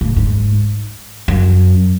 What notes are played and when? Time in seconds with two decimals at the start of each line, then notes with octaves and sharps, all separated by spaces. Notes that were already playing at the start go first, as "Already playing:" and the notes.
0.01 A2
0.16 G#2
1.28 F#2